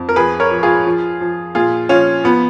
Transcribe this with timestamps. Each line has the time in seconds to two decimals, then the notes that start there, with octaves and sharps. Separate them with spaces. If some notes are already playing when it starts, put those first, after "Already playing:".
Already playing: F2
0.09 A#4
0.16 F3 G#4 B4
0.40 A#4 C#5
0.51 F3
0.63 F4 G#4
0.86 F3
1.21 F3
1.55 A#2 F4 G#4
1.89 F3 C#4 F4
2.24 F3 B3